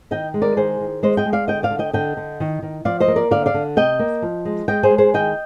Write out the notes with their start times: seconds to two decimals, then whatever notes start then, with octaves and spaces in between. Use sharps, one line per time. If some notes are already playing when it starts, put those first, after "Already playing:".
0.11 D#3 D#5 G5
0.34 G#3
0.42 A#4 D5
0.56 D#3 G#4 C5
0.80 D#3
1.03 G#3 C5 D#5
1.17 D#5 G5
1.26 G#3
1.33 D5 F5
1.48 D3 D#5 G5
1.63 D5 F5
1.71 D3
1.79 D#5 G5
1.93 D3 D#5 G5
2.17 D3
2.40 D#3
2.62 D#3
2.85 F3 D5 F5
3.00 C5 D#5
3.08 A#3
3.16 A#4 D5
3.31 D3 D5 F5
3.46 D5 F5
3.54 D3
3.76 C3 D#5 G5
3.99 A#3
4.22 F3
4.45 G#3
4.68 G#3 D#5 G5
4.83 G#4 C5
4.91 G#3
4.98 G#4 C5
5.14 D#3 D#5 G5